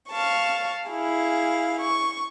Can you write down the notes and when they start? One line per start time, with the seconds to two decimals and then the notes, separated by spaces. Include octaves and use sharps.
0.11 F5 A5 C#6
0.89 E4 G#4 F5
1.82 C#6